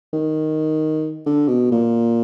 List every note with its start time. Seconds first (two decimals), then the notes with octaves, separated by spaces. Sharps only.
0.13 D#3
1.26 D3
1.48 B2
1.71 A#2